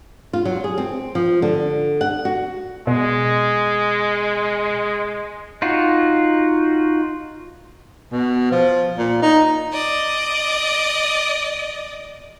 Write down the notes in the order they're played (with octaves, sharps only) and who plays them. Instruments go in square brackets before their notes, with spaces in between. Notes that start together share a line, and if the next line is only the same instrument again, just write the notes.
[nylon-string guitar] F4
F#3
G#4
C4
F3
D3
F#5
F#4
[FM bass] B2 [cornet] G#3
[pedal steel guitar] D#4 F4 F#4
[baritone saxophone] B2
F3
A#2
D#4
[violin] D5 D#5